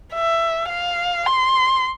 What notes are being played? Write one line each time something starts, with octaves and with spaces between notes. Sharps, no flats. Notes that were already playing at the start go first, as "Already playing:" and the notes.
E5
F5
C6